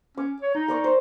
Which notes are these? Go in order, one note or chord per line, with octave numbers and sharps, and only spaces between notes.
C#4 D6
C#5
D#4
A#4 D5 C#6
C5